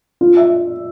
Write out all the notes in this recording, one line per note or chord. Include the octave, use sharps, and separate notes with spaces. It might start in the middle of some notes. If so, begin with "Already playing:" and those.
F4
E5